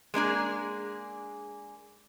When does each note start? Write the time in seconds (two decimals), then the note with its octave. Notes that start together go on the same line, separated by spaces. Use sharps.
0.14 G#3 A#3 D4 G#4